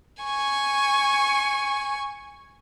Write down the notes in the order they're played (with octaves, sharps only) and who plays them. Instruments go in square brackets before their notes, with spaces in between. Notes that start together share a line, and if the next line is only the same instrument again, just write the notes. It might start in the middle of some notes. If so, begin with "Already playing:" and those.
[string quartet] G#5 C#6